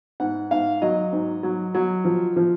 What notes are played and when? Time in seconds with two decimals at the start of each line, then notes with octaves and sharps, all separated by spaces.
0.20 G#2 F#5
0.51 G#2 F5
0.82 F#3 D#5
1.12 G#2
1.43 F#3
1.74 F#3
2.05 F3
2.36 F3